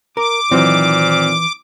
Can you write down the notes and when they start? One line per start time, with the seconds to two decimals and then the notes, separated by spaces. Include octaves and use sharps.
0.17 A#4 D6
0.51 A#2 D#3 E3 F#3 C4